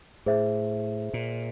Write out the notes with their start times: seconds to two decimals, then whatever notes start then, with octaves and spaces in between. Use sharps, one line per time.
0.26 A2 G#4 C5 E5
1.14 A#2